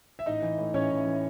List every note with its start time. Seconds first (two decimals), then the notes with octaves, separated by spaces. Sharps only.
0.19 E5
0.26 A1 D#4 D#5
0.42 E3
0.58 A2
0.74 A1 C#4 C#5
0.90 A1
1.06 E3